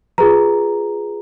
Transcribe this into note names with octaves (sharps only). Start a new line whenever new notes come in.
F4 G#4 B4 A#5